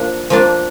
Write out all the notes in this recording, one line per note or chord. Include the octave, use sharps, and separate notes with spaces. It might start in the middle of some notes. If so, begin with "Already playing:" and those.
Already playing: F3 A#3 D4
F3 A#3 D4